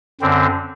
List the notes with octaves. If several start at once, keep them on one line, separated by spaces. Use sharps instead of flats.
F#2 D3 C4